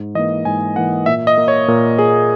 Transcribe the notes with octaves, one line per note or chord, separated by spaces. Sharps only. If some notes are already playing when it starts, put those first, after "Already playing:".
Already playing: G#2
E3 A#3 D#5
G#2 G#5
E3 A#3 F#5
A#2 E5
D#5
A#3
C#5
A#2 A#4
A#3 G#4